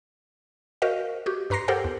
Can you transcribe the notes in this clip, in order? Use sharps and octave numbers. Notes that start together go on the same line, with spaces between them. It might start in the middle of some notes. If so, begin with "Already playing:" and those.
F#4 A#4 C5 D#5 F5
F#4 G4
G2 B4 A#5 C6 A#6 C7
G4 A4 A#4 C5 F#5 G5
E2